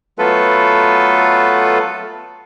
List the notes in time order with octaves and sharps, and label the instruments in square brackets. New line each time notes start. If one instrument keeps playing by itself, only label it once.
[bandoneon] F#3 A3 B3 F4 A4 B4